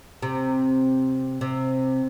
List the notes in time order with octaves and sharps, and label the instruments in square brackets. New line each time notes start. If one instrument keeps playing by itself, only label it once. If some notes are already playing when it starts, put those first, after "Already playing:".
[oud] C3
C3